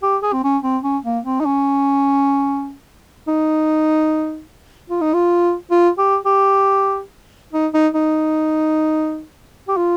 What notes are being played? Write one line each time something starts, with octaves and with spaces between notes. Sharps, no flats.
G4
G#4
C4
C#4
C4
C#4
A#3
C4
D#4
C#4
D#4
F4
D#4
F4
F4
G4
G4
D#4
D#4
D#4
G4
F4